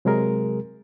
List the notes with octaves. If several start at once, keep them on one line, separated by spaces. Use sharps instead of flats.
C3 F#3 G#3 G#4 A#4